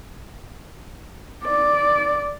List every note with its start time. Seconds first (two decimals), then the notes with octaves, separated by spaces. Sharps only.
1.45 D5